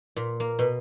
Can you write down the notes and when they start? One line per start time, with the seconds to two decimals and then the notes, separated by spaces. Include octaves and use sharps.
0.16 A#2
0.40 A#3
0.59 B2